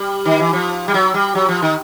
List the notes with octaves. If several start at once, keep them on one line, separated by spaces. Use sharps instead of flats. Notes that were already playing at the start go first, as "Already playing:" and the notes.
Already playing: G3
D#3
E3
F3
G3
F#3
G3
F#3
F3
D#3